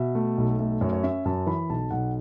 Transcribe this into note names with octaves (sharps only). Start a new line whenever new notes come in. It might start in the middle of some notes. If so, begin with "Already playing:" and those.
Already playing: B2 E5
A3
B1
A3
F#2 C#5
C#5
C#4 E5
F#2 A5
E3 B5
B1 A5
B1 F#5